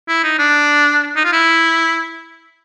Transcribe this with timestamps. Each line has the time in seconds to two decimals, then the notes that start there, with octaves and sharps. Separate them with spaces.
0.08 E4
0.23 D#4
0.39 D4
1.16 D#4
1.25 F4
1.32 E4